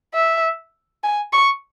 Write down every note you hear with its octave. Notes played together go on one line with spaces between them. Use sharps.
E5
G#5
C#6